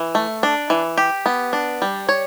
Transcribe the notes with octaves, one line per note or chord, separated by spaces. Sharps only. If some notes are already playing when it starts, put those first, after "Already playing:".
Already playing: E3
A3
D4
E3
G4
B3
D4
G3
C#5